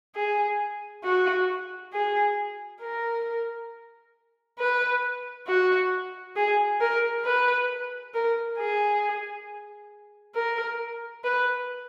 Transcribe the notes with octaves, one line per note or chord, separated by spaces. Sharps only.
G#4
F#4
G#4
A#4
B4
F#4
G#4
A#4
B4
A#4
G#4
A#4
B4